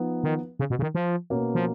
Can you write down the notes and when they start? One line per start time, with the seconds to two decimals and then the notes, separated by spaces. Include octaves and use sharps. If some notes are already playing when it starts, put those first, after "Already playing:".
Already playing: F3 B3 D#4
0.24 D#3
0.59 C#3
0.70 B2
0.79 C#3
0.82 D#3
0.95 F3
1.30 B2 A#3 C#4
1.55 F3